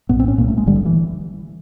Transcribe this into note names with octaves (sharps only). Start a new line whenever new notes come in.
A#1 A2 B3
C4
C#4
C2 A#2 A#3
A3
G#3
G#1 G2 D3 G3
F3
E3